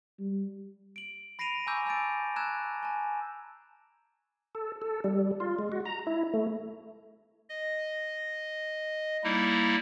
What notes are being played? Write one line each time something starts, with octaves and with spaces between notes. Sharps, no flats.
G3
D7 F#7
B5 A#6 C7 D7 D#7 F7
G#5 A#5 C#6 D6 E6 G6
A5 E6 G6 A6 D7
A5 A#5 E6 F#6 G#6 E7
G#5 A5
A4
A4
G3
F4
G#3
F#4
A#5
E4
A3
D#5
G3 A#3 D#4 E4